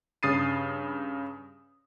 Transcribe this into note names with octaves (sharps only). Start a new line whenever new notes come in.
G2 C#3 D#6 A6 C7 D#7